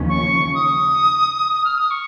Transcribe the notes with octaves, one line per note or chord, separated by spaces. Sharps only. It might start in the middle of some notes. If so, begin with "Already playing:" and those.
Already playing: D#2 C#3 F3 C#4
C#6
D#6
F6
D#6
C#6